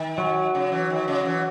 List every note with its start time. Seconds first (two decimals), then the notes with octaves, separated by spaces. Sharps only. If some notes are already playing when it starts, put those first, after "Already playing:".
Already playing: D#3
0.18 F#3
0.55 C#3
0.72 E3
0.90 D#3
1.08 C#3
1.25 E3